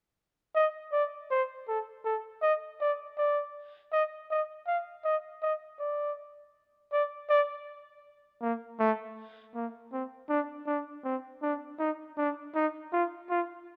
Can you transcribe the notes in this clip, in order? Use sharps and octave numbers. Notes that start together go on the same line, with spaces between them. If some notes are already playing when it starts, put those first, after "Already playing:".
D#5
D5
C5
A4
A4
D#5
D5
D5
D#5
D#5
F5
D#5
D#5
D5
D5
D5
A#3
A3
A#3
C4
D4
D4
C4
D4
D#4
D4
D#4
F4
F4